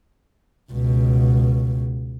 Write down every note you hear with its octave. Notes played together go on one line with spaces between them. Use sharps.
C#2 B2